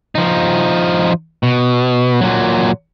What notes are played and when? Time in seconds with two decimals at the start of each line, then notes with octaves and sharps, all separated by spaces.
0.15 F3 D#4
1.43 B2
2.21 A#2 F#3